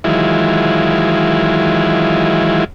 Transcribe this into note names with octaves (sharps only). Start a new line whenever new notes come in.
D#3 E3 F#3 G#3 E4 F4